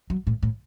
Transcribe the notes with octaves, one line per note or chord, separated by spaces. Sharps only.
F#3
A2
A2